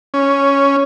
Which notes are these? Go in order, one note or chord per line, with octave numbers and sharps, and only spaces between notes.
C#4